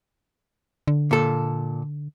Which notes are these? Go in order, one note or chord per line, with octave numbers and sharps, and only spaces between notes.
D3
A#2 A4